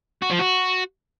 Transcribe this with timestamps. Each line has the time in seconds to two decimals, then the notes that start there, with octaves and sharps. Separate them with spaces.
0.22 F#4
0.30 F3
0.39 F#4